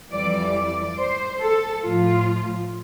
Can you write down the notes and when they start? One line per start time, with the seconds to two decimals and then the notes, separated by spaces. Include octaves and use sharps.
0.11 F2 E3 G3 D5
0.55 D5
0.97 C5
1.40 A4
1.83 A2 F3 F4